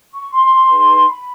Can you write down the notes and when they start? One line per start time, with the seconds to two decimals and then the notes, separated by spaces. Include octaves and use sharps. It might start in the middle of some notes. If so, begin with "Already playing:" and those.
0.12 C#6
0.31 C6
0.69 D#4 G#4 B4
1.08 B5